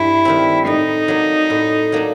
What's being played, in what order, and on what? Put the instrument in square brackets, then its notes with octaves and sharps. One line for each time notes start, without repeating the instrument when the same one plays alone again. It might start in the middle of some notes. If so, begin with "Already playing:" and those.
Already playing: [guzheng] G2 G3 [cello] E4
[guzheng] D#3 G3 C4
[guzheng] A2 [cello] D#4
[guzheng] F#3 A#3 D4
A2
F#3 A#3 D4